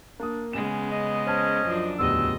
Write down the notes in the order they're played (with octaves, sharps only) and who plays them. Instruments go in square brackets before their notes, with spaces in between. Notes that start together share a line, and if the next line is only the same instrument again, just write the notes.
[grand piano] A#3 D#6 [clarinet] D4
[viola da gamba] C#3 G#3 B3 [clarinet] C#4 [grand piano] E7
[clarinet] D#5
[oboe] C#4 [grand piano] C5 A5
[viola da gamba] F#2 F3 D4
[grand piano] D1 E2 G4 [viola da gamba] C#3 D#5 [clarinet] F4 [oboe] E6